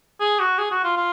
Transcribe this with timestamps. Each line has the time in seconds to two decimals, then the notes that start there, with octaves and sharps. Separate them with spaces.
0.20 G#4
0.39 F#4
0.58 G#4
0.71 F#4
0.84 F4
0.97 F4